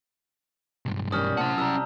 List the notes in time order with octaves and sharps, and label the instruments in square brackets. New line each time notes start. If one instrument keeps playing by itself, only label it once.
[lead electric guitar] B1 G2
[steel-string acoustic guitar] D#3 G3 C#4 [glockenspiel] D#6 F6
[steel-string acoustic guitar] A2 C3 [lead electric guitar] C#4 F#5 [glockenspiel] A5
[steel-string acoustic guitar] C3 G3 [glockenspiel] A#5 E6